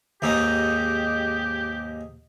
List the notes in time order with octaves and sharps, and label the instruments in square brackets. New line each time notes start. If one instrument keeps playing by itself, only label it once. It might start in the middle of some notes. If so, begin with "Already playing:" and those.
[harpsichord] D#2 G#2 D#4 [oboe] G4